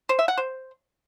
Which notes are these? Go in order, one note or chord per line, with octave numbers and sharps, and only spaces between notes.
C5
E5
F#5
C5